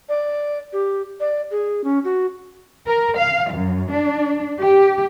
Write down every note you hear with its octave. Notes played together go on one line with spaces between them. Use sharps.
D5
G4
D5
G#4
C#4
F#4
A#4
F5
F#2
D4
G4